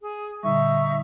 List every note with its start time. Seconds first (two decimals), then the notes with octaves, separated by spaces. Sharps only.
0.02 G#4
0.43 A#2 D3 G3 D#4 E5 C#6